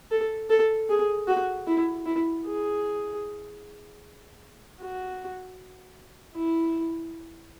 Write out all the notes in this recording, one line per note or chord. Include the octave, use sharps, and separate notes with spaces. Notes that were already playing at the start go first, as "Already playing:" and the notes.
A4
A4
G#4
F#4
E4
E4
G#4
F#4
E4